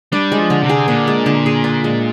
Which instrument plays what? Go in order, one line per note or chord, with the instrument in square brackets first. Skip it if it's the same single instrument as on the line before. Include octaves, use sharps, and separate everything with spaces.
[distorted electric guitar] G3 [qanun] D4
[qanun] G#3
[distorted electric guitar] F3
[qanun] D3
[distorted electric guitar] C3
[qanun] G#4
[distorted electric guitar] A#2 [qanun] D4
[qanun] G#3
D3
G#4
D4
G#3